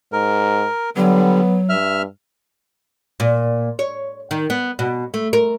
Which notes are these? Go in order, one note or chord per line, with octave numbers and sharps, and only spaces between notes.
G#2 A#4
D3 F#3 G3 B3
G2 E5 F6
A#2
C#5
D#3
B3
B2
A3
A#4